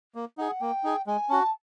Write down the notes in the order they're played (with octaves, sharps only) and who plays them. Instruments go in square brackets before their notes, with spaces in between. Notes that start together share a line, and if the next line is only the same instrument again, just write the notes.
[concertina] A#3
[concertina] D#4 G#4 [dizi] F#5
[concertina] A#3 [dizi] G5
[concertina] D#4 G#4
[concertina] G#3 [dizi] G#5
[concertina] C#4 F#4 [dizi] A5